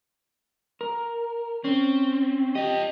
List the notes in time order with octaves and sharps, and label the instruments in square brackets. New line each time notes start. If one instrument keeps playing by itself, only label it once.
[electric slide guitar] A#4
[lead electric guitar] C4 [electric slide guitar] C#4
[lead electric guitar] F4 D#5 [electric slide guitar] G4